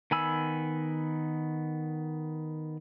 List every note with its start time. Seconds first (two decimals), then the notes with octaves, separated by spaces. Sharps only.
0.11 D#3 B3 G#5 B5 E6